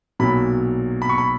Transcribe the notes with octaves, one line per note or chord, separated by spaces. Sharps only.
B1 A#2 F#3 B5
B5
C#6
B5